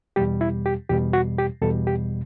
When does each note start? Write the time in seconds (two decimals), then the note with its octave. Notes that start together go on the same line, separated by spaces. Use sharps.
0.16 E2 B2 G3 G4
0.41 E4
0.66 G4
0.89 E2 B2 G3 G4
1.13 F#4
1.38 G4
1.62 E2 B2 G3 A4
1.87 G4